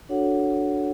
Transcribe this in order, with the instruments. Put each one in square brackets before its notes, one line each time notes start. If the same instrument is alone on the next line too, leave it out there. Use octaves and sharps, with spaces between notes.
[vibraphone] D4 F#4 A4 C#5 F#5